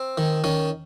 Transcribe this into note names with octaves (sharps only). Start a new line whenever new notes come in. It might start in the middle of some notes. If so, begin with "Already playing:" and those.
Already playing: C4
D#3
D#3 C#4